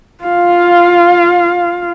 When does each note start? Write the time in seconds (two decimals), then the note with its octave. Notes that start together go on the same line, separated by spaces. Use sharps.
0.24 F4 F5